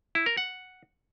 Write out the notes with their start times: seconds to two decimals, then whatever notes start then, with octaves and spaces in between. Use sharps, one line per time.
0.15 E4
0.26 A#4
0.37 F#5